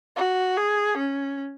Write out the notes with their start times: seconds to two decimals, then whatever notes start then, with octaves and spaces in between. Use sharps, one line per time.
0.16 F#4
0.57 G#4
0.97 C#4